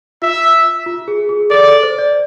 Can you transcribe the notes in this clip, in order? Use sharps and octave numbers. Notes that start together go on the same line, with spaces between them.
F4 E5
F4
G#4
G#4
A4 D5
C5
D5